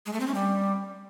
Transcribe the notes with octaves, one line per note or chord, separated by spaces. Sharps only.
G#3
A3
C4
C#4
G3